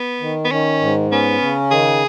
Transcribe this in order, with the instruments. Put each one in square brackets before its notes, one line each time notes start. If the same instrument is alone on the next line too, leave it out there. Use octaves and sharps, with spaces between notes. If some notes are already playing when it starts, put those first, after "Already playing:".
Already playing: [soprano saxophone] B3
[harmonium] D#3
[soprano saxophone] B3
[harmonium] D#3 [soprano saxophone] C#4
[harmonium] G#2
[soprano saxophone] B3 [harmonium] C#4
[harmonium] C#3
[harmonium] D#3 [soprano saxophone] G#4